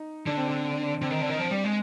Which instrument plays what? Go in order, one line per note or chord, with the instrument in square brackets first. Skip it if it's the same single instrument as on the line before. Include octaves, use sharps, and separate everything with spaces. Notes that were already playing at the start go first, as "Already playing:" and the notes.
Already playing: [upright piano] D#4
[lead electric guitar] D3 [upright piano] D4
[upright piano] C4
D4
[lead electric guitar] D3 [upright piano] C4
[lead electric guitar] D#3
D3
D#3
F3
G3
G#3